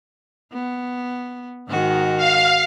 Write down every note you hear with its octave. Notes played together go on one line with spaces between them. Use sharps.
B3
G#2 D#3 F#4
F5